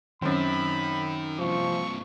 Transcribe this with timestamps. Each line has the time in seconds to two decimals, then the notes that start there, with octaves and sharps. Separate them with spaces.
0.22 F#2 D#3 C4 B5
1.39 G2 C3 F3 C#6